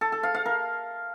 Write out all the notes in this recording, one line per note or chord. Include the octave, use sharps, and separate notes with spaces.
A4
A4
F5
F5
A#4